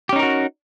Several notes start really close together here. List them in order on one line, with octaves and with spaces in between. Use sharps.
G4 C#4 D#4 A#4 F#4